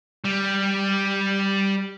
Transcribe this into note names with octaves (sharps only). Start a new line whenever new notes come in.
G3